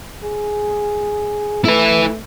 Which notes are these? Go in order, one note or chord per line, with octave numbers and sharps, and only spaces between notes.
G#4
A3 E4 B4